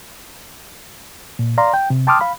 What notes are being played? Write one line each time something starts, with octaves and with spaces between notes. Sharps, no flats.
A#2
D5 F5 A#5 C6
G5
C3
G5 A5 C6 D6 D#6 F6
F5 B5